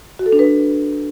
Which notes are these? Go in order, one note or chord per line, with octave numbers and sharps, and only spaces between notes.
F#4
A4
D4
B4